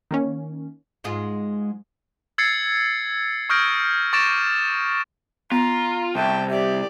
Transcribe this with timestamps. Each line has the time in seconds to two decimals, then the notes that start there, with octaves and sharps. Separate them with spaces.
0.11 D#3 A#3 C#4
1.04 G#2 G#3 F4
2.38 E6 G#6 A6 C7 C#7
3.49 C#6 D#6 F6 G6 A#6 D7
4.13 C#6 D6 A6 A#6 D7 E7
5.52 B3 F4 A#5
6.15 C2 E5 G5 A5
6.50 G4 D5 E5